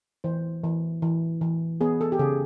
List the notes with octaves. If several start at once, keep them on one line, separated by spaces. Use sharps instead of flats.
E3 C5
E3
E3
E3
B3 G#4
A4
G4
C#3 G#4